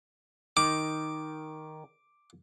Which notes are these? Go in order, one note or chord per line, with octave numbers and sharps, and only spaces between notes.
D#3 D#4 D6